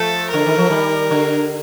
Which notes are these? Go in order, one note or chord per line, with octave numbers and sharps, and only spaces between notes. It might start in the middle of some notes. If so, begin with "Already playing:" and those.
Already playing: F3 A3 A4
D3 A#4
D#3
F3
D#3 G3
D3